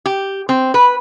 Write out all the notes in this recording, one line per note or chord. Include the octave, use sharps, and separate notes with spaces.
G4
C4
B4